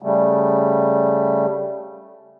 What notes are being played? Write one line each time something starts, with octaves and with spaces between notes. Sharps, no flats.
C#3 G3 A3